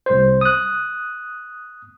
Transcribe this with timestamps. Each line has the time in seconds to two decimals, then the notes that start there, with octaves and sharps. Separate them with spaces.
0.06 C2 C5
0.41 D#6 F#6